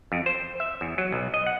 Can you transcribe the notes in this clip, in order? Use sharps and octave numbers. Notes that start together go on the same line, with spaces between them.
F2
C5
E5
E2
F#3
B1
D#5
F#5